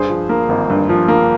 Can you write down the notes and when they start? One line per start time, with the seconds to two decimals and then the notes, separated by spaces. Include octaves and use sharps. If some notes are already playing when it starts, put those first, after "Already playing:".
Already playing: G2 G#4 C5
0.10 F3
0.29 A#3
0.49 G#1
0.70 G2
0.89 F3
1.08 A#3